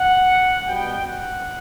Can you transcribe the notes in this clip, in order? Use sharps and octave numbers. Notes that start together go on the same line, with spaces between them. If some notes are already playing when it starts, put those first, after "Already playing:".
Already playing: F#5
B2 G3 B3 G5
F#5